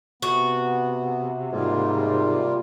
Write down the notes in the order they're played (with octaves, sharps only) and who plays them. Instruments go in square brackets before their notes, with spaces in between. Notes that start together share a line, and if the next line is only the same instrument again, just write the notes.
[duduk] C3 [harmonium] B3 [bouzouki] F#4
[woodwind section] G#2 [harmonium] G3 A#3 F4